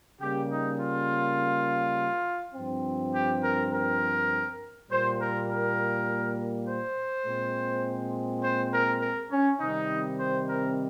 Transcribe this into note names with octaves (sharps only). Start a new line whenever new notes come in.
C#3 G3 A#3 G4
D#4
F4
G2 F3 C4
G4
A#4
A#4
A#2 G3 A#3 C5
A#4
A#4
C5
A#2 G#3 C4
C5
A#4
A#4
C#4
C3 D#3 G3 C4 D#4
C5
A#4